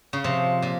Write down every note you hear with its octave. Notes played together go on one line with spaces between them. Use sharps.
C#3
C3 F3
A#2